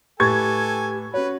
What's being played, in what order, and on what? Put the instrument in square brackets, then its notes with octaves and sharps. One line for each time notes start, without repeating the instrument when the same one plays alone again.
[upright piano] A2 B4 A6 [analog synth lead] G4 [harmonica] A4 G#5 [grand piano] C#6 G#6
[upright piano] C#4 F#4 [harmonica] B4 [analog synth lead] C#5